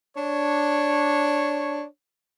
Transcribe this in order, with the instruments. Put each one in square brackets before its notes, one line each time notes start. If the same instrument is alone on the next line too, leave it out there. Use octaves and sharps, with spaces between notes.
[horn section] D4 C#5